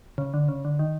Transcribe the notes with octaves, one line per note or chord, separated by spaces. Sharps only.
C#3
D3
C#3
D3
D#3